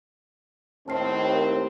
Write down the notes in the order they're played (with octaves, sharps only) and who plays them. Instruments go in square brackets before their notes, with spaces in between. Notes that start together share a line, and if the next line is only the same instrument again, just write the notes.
[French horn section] D#2 A2 C4 [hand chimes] A5 F6 C7
[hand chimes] G4 A#4 C5